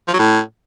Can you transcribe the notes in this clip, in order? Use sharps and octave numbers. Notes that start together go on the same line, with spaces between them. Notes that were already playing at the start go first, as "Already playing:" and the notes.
F3
F#3
A2